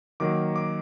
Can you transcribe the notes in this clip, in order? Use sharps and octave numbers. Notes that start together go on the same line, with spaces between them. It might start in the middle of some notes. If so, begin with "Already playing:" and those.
D#3 F#3 A#3 D6
D6